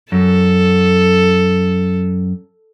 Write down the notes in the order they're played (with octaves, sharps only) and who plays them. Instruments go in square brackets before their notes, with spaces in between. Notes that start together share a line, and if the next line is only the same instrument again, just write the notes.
[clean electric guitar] F#2 [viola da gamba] A4